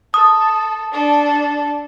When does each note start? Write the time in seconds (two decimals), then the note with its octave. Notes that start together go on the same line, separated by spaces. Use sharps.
0.14 A4 D#6
0.91 D4 A4